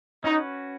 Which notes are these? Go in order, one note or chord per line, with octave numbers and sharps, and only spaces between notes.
C#4 D#4 F#4 B4